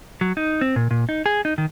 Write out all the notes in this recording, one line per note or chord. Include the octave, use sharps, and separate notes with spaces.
F#3
D#4
C4
A#2
A#2
D#4
G#4
D#4
D#3